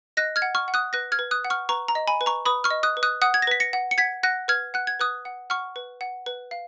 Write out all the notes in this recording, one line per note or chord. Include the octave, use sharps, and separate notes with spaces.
D#5 F#6 A#6
F6 G#6
F#5
C#6 F6
F#5
D#6 F#6
B4 F#6 A#6
F6 G#6
B4
D#6 F#6
F#5
C#6 F6
B4 A#5 C#6
A#5
D#5
G#5 B5
B4
A#5 C#6
B4 B5 D#6
C#6 F6
D#5
D#6 F#6
B4
D#6 F#6
F#5 D#6 F#6
G#6
A#6
B4 B6
A#6 C#7
F#5
C#7
F#5 G#6 B6
F#5 F#6 A#6
B4 F6 G#6
F#5 F#6
G#6
B4 D#6 F#6
F#5
F#5 C#6 F6
B4
F#5
B4
F5